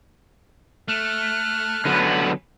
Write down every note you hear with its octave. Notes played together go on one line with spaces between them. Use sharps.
A3 F6 F#6
D3 F#3 B3 C#4 B4